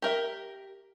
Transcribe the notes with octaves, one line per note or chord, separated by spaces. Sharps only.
G4 A#4 E5